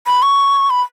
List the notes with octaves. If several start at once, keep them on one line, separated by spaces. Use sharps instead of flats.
B5
C#6
B5